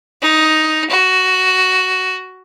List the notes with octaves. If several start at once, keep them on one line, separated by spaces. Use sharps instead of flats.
D#4
F#4